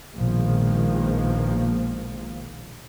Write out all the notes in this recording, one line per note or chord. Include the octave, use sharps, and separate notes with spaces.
A#1 B2 D#3 F3 G#3 A#3